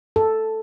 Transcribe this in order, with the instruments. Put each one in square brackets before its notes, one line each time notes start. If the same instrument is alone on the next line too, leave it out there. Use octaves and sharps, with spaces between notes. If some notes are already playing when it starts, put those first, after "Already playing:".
[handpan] A4